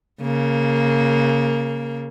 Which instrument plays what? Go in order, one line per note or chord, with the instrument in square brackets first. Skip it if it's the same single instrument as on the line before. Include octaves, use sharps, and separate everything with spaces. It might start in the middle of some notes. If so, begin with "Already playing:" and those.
[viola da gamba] C#3 A#3